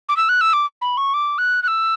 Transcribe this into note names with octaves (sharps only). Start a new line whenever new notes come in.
D6
E6
F#6
E6
D6
B5
C#6
D6
F#6
F#6
E6